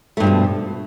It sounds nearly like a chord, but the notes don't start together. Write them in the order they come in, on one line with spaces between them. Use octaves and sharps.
A3 G2 F3 B2